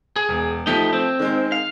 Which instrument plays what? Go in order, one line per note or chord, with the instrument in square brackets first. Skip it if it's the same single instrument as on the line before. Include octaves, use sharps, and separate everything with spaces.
[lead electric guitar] G#4
[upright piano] E1
[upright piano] F3 A3 [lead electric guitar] D#4 G4
[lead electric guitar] C4
[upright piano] D#3 G#3
[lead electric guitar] F5